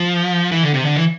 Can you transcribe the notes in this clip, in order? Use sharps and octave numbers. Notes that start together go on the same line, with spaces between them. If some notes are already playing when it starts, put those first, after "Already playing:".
Already playing: F3
E3
D3
C3
D3
E3